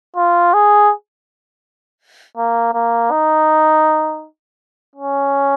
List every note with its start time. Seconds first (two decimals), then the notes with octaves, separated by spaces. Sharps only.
0.16 F4
0.54 G#4
2.37 A#3
2.74 A#3
3.11 D#4
4.95 C#4